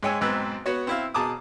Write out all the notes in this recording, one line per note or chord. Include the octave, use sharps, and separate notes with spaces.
G#2 G#3 C#5 G5 G#5 E6
B1 G#2 C4 B4 E6
B3 F#4 C#5
C4 E4 F5
B2 G#4 A5 A#5 D6 D#6